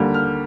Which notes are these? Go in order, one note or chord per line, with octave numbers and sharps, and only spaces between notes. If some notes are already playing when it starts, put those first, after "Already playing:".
Already playing: D#2 D3 G3 A#3
F6